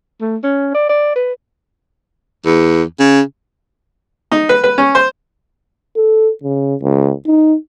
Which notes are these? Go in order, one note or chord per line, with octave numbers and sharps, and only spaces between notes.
A3
C#4
D5
D5
B4
E2
C#3
D#4
B4
B4
C#4
C5
A4
C#3
C#2
D#4